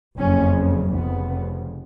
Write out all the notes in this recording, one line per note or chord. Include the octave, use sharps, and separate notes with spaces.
F#1 F2 C#3 C#4
F1 F2 C#3 B3